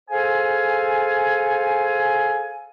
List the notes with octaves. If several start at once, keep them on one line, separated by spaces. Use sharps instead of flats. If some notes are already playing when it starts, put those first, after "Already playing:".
G#4 A4 C5 F5 G#5